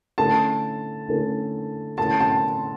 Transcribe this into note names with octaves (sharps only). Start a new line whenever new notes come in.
D3 A3 C#4 E4 A5
D3 A3 C#4 E4
D3 A3 C#4 E4 A5
A5